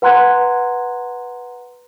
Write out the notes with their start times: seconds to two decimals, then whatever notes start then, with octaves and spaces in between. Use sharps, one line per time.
0.02 B4 F#5 A#5 C6 F#6 G#6